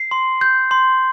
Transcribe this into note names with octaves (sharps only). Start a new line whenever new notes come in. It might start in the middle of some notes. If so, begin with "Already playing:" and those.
Already playing: C7
C6
G6
C6